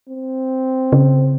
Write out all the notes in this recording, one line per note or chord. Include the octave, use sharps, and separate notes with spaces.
C4
C#3